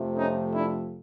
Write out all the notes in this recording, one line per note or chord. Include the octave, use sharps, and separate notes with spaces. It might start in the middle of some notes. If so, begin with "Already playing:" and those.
Already playing: F2 C3 F3 A3
C#4 D#4
D4 E4